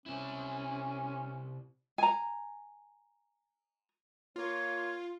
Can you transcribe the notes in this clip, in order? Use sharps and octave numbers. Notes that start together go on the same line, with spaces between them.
C3 C#4 E4
G#5 A#5
A#3 F4 C#5